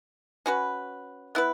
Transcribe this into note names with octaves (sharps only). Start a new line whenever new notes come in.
C#4 F#4 B4
B3 E4 B4